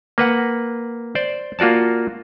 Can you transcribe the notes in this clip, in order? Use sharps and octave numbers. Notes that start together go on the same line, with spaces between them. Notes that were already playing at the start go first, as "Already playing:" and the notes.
A#3 B4 F#5
C5 D5
A#3 F4 F#4 D5 A5